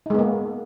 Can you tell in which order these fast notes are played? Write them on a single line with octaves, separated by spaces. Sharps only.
D#4 G#3 B3 A#3